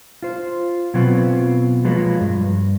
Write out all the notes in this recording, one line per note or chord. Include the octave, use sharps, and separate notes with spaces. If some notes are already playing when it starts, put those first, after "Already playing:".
F4 C5
B2 F#3 B3 C4 F4 B4
F3 F#3 G#3 A#3 F4 B4
G2